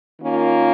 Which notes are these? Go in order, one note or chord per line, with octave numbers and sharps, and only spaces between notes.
D#3 A#3 C#4 F4